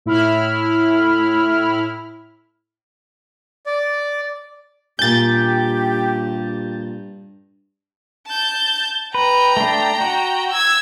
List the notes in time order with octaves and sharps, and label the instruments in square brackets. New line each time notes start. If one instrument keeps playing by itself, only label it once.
[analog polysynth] A2 E4 B5 F6
[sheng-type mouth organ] D5
[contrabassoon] G2 [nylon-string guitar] A#2 G#5 [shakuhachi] G4 [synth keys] G6 A6
[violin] A5 G6
[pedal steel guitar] B4 [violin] G5 A#5
[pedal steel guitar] A3 D4
F#4
[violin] E6 G#6